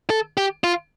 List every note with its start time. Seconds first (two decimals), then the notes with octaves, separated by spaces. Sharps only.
0.10 A4
0.37 G4
0.64 F4